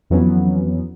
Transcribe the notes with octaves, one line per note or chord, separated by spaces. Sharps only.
F2 E3 F#3 B3 C#4